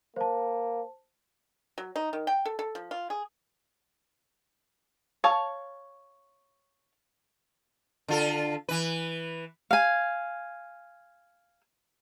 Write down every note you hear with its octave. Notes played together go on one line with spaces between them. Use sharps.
A#3 C5 A5
F#3
D#4
D#3
G5
A4
A4
F3
F4
G#4
C#5 F5 A5
D3 F4 A4
E3 B4
F5 G#5